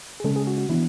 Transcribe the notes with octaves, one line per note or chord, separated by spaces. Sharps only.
G#4
C#3 G#3 C#4 A4
G#4
F#4
F#4
E3 B3 D4 E4